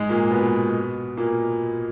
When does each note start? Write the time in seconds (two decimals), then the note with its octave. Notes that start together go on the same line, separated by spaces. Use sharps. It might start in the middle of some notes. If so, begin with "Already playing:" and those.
Already playing: G#2 G#3
0.09 A#2 A#3
0.31 B2 B3
1.17 A#2 A#3